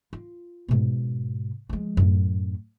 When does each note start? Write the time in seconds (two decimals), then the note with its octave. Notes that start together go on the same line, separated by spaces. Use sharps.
0.13 F4
0.68 G#2 B2
1.69 F3 G#3
1.97 F#2 A2